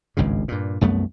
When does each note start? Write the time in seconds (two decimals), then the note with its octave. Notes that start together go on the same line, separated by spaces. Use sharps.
0.17 G#1 C#2 G2 C#3
0.48 G2 A#2
0.81 C2 F#2 A3 B3